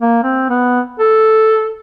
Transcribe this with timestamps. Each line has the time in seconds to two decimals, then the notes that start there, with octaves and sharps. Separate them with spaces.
0.01 A#3
0.23 C4
0.49 B3
0.99 A4